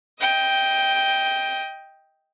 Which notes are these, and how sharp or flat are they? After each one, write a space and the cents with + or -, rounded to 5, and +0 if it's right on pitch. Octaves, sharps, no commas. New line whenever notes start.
D#5 +20 G5 +0